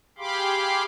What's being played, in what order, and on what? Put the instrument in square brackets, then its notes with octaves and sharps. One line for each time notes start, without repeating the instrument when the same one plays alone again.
[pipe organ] G4 G#4 F5 B5 C6 D6